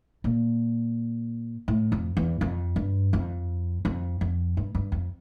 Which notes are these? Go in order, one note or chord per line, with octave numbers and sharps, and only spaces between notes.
A#2
A2
F2
E2
F2
G2
F2
F2
F2
G2
G2
F2